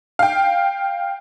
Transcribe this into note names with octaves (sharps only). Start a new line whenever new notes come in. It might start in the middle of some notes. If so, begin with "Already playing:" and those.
F5 G5